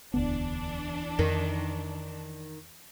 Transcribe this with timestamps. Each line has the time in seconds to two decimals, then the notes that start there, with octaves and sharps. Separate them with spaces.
0.14 E1 D2 E3 B3 D4
1.19 F2 D#3